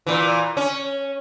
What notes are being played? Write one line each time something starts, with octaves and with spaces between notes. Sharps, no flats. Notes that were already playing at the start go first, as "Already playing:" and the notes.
A#2 E3
C#4